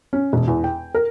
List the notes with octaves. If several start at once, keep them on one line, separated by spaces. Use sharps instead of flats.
C#4
E1
E2
G5
A#4